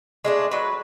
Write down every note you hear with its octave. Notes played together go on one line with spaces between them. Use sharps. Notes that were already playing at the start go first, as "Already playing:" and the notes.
G#3 A3 D4
F#3 B4